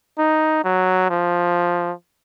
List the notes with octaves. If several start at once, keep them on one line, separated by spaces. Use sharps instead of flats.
D#4
F#3
F3